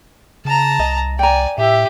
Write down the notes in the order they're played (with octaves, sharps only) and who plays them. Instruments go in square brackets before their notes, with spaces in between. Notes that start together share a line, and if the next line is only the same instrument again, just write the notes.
[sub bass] C#3 [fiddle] A5 A#5
[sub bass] C2 [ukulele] D#5
[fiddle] D5 G#5 [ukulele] G5 A#5
[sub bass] A2 [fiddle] G4 [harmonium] E5